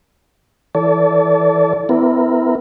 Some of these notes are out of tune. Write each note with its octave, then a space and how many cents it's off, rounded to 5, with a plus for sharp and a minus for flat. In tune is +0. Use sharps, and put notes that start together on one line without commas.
E3 +0 A4 +0 D5 -30
B3 +40 E4 +0 A#4 +0